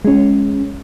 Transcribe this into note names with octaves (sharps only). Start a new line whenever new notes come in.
G#3 C#4